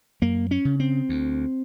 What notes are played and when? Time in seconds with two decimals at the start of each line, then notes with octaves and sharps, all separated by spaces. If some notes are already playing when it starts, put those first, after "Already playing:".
0.22 F#2 A#3
0.51 C#4
0.65 C#3
0.80 C4
1.09 D2